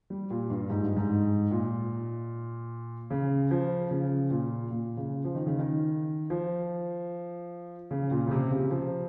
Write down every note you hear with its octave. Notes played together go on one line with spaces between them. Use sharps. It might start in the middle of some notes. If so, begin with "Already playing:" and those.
G3
A#2
G2
G#2
G2
G#2
A#2
C#3
F3
C#3
A#2
A#2
C#3
F3
D#3
C#3
D#3
F3
C#3
A#2
C#3
C3
C#3
F3